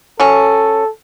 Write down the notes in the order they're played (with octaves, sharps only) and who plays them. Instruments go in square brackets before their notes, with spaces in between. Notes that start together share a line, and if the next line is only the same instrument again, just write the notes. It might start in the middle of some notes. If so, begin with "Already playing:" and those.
[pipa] F#3 C#4 [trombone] A4